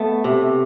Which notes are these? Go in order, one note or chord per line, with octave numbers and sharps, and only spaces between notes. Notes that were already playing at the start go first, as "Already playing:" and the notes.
Already playing: A3 B3
C3